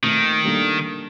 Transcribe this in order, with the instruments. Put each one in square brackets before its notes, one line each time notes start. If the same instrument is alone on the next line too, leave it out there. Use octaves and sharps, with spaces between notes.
[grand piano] A#2 A3 C4 [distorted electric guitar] D#3
[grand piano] G3 A#3 D4 A4